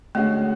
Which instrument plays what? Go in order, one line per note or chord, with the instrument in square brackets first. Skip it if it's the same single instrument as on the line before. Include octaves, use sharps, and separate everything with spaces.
[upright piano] D3 G#3 C#4 F#4 [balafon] A3